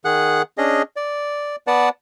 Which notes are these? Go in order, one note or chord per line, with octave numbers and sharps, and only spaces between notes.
D#3 G#4 F#5 F#6
C#4 D4 G#4 D#5
D5
B3 B4 D5 F#5 A5